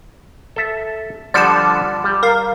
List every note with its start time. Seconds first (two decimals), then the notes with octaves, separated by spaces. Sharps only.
0.56 A4 E5
1.34 D3 F3 G3 D5 F#5 A5
2.04 G3
2.23 A#4 F5